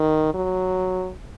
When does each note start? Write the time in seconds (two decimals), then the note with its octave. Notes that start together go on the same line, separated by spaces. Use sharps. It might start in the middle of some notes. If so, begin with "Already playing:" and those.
Already playing: D#3
0.34 F#3